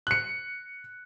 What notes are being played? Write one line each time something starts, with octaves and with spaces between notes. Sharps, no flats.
F#6 C#7